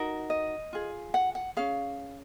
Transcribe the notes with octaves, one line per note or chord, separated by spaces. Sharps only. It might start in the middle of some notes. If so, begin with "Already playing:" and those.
Already playing: D#4 F#4 A#4
D#5
F4 G#4
F#5
F#5
C#4 G#4 F5